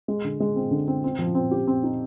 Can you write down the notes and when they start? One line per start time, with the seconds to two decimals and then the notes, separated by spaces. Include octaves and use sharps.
0.08 G#3
0.24 D3
0.40 G#3
0.56 C4
0.71 D3
0.87 C4
1.04 C4
1.19 F3
1.34 C4
1.51 G4
1.67 C4
1.83 D#4